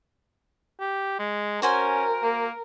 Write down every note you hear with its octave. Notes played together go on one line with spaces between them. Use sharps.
G4
G#3
C#4 F#4 A#4 C5 G#5
A#3